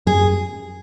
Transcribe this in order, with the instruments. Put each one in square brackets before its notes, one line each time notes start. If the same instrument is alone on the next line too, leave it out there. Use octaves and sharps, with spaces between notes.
[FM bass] F#2 [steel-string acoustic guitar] G#4